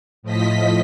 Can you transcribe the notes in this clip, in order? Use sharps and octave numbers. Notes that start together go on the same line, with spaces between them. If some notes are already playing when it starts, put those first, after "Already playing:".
A2 F3 D#5 B6